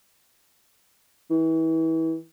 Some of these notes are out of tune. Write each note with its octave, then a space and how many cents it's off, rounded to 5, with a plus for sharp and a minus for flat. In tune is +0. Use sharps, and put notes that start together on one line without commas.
E3 -30